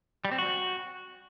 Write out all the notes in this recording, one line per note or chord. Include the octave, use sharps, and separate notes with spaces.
G3
C4
F#4